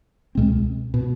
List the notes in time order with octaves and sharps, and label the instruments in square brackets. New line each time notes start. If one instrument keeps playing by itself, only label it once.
[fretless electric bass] C#2 B2 G#3 C4
B2